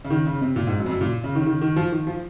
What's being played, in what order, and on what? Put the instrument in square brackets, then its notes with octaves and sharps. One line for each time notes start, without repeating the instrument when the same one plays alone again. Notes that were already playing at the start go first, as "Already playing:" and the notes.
[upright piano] C#3
D#3
C#3
C3
A#2
G#2
F#2
F2
F#2
A#2
C#3
D#3
C#3
D#3
D#3
F3
D#3
F3